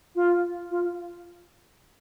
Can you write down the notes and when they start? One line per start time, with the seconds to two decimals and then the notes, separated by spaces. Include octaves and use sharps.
0.15 F4
0.70 F4